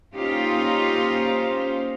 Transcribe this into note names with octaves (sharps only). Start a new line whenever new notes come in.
A#3 C#4 D#4 F4 G4 C5